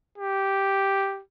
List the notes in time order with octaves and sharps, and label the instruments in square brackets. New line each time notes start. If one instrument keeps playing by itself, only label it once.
[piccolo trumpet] G4